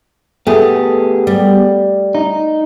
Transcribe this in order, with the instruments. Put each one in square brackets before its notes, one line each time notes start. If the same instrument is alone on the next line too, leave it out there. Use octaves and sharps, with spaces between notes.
[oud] A3 [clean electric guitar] B3 G4 G#4
[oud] G3
[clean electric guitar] D#4